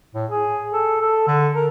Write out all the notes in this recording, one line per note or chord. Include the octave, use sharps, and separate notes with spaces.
A2
G#4
A4
A4
D3
A#4